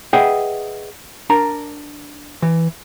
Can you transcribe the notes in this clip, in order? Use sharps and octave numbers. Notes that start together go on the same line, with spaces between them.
G#4 B4 D#5 E5 F#5 G5
D4 A#4 A#5
E3